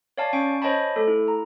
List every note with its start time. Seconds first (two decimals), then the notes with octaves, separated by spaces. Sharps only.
0.18 C#5 D5 F5 G#5 A5
0.33 C#4 G#5 C#6 D7
0.62 C5 C#5 D#5 G#5 A5 B5
0.96 A3 A4
1.08 E4
1.28 A#5